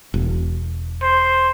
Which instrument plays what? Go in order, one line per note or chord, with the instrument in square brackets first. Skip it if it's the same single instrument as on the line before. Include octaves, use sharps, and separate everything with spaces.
[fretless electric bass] E1
[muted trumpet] C5